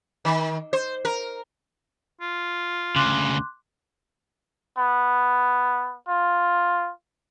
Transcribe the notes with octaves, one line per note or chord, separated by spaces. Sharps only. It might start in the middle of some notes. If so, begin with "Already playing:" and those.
D#3
C5
A#4
F4
D2 C#3 C6 D6 F#6
B3
F4